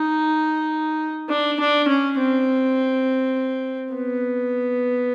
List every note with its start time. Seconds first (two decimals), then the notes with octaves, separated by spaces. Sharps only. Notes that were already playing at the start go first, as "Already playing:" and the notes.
Already playing: D#4
1.29 D4
1.60 D4
1.88 C#4
2.19 C4
3.94 B3